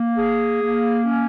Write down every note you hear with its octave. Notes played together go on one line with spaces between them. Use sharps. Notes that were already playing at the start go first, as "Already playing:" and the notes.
Already playing: A#3
G#4
A#3
C#4